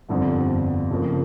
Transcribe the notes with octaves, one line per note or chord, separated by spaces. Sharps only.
G1 F2 D3 G3 C4
F2 C#3 F3 A#3